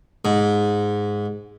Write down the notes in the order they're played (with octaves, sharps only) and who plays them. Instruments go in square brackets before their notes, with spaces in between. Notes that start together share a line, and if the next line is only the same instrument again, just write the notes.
[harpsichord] G#2